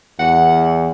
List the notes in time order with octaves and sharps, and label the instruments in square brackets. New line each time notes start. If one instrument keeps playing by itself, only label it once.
[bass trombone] E2 [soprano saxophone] F#5